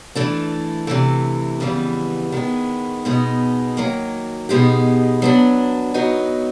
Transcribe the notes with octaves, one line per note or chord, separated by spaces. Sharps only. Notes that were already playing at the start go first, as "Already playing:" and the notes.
E3 A3 D4
C3 E3 A3
F2 C#3 E3 G3 B3
D#3 G#3 B3
B2 G#3 B3 D#4
D#3 F#3 A#3
B2 G#3 B3 D#4 G4
F#3 B3 D4
F#3 B3 D#4